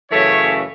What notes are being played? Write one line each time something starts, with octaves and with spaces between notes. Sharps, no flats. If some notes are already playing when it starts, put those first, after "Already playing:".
F#2 C#3 E3 A3 C#5